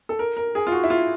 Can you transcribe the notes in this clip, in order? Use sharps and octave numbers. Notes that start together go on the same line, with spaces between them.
A4
A#4
A#4
G#4
F4
F#4
E4
F4